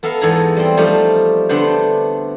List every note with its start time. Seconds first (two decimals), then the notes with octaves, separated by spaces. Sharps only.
0.03 B3 A4 E5 F5 A#5
0.21 E2 G#2 B3 A4 G#5 A#5
0.57 G3 C4
0.77 F3 G3 A3 D#4 G4
1.49 D3 A3 B3 D4 C5